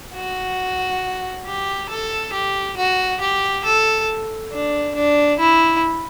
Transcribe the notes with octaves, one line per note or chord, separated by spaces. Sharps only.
F#4
G4
A4
G4
F#4
G4
A4
D4
D4
E4